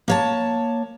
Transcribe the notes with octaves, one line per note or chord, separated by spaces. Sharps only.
A#3 C#5 A5